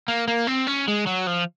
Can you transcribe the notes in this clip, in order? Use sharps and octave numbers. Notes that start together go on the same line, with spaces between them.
A#3
A#3
C4
C#4
G#3
F#3
F3